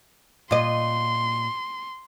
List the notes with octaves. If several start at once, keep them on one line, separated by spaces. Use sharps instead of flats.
A#2 D#5 C6